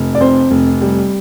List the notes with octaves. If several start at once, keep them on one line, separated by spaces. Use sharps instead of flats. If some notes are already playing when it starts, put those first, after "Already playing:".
Already playing: F1
D5
F2 C5
F1
G3